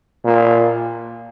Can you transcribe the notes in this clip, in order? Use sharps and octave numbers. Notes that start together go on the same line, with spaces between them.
A#2